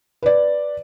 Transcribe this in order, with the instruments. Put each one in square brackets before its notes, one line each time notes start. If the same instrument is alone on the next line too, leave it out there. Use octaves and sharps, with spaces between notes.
[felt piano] B4 D5